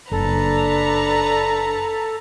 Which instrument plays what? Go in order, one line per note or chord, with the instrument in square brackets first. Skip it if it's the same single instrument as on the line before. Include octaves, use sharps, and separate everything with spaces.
[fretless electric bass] F#1 [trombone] D4 [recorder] A4 [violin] B4 A#5